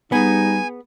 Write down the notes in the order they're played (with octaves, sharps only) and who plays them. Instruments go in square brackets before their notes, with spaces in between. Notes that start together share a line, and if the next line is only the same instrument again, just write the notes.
[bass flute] G3 [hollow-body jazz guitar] B3 G#4 [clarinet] D#4 [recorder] G#5